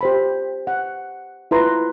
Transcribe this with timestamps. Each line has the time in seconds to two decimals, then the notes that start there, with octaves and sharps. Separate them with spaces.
0.01 G4 C5 B5
0.67 F#5
1.51 E4 F4 B4 A#5 C6